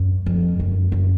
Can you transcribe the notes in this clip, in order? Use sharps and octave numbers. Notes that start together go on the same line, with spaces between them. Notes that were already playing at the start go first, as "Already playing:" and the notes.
Already playing: F#2
F2
F#2
F#2